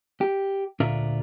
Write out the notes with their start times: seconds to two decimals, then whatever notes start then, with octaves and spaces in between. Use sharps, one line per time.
0.21 G4
0.80 D2 A#2 D4 F4 A#4 E5